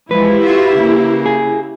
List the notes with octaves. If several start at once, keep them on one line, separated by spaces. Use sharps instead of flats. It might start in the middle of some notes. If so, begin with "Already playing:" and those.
E3 F3 G#3 E4 G4 B4
F4 F#4 E5
C#3 A#3
G#4